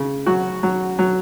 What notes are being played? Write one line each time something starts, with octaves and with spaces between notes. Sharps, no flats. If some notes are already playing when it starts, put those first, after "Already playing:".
Already playing: C#3
F#3 F#4
F#3
F#3